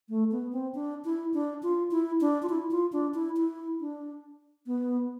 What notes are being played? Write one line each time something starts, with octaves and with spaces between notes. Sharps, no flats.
A3
B3
C4
D4
E4
D4
F4
E4
D4
F4
E4
F4
D4
E4
E4
D4
B3